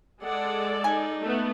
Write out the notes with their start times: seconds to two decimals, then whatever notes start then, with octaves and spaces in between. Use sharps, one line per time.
0.22 G#3 A4 D5 F#5
0.84 D#4 G#5
1.22 A3 B3